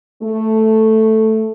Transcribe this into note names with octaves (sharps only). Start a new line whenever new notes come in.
A3